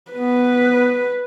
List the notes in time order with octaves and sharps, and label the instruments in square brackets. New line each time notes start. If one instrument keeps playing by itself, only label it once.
[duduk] B3 [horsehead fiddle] B4